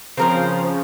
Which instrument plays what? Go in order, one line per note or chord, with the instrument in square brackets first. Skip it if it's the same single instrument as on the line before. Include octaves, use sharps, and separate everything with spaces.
[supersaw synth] C#3 F3 [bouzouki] C4 A#4 C5